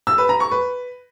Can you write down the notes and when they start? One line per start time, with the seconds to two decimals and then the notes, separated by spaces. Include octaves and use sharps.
0.07 E6
0.18 B4
0.29 A#5
0.40 C#6
0.51 B4